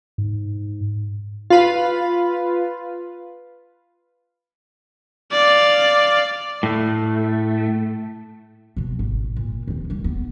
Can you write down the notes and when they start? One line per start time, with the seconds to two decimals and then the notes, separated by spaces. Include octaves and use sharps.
0.18 G#2
1.50 F4 B4
5.32 D5 F5
6.63 A2 A3
8.76 B2 F#3
8.99 G#1
9.36 A#2
9.68 D#3 C4
9.90 D#2 G3
10.04 B3